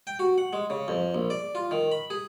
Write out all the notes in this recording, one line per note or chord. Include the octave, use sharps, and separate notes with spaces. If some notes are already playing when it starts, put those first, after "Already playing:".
G5
F#4
F#5
G#3
C#3
F2
A#1
D5
F4
D#3
B5
G#4